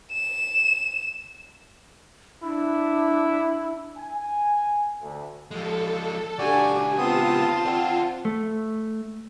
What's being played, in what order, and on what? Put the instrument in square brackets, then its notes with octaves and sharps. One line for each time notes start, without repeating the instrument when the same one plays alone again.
[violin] E7
[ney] D4 [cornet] E4
[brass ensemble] G#5
D2
[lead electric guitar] F3 G#3 [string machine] A4
[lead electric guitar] C#2 G4 [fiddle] D4 G#5 [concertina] F#4 D5
[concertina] B3 C4 D#6 [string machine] F4 [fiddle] C5 A5
[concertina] C4 [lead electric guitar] D5 F#5
[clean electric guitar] A3